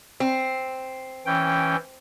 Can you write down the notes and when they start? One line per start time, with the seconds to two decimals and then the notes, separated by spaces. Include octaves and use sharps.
0.20 C4
1.26 E3 C#4 G5